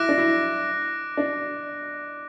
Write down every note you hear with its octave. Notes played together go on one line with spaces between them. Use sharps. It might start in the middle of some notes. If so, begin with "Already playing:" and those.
Already playing: E4 D6 F#6 A#6 D7
D4
E4
D4